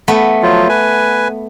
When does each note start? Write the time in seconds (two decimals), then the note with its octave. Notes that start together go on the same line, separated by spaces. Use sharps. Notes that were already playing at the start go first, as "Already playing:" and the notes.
0.08 A3 B3
0.43 F3 F#3 F4
0.69 B4 G#5